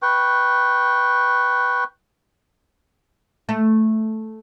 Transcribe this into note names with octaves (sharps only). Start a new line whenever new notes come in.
B4 G5 C#6
A3